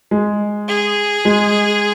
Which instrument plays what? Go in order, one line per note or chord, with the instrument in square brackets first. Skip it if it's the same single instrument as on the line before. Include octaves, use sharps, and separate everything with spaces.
[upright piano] G#3
[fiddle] G#4
[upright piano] G#3